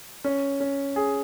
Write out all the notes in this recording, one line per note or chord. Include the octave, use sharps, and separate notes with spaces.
C#4
C#4
G#4